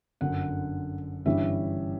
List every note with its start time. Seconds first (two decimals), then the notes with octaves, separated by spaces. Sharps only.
0.21 G1 F#2 D3 F#5
1.26 G1 G2 E3 G3 C#4 E5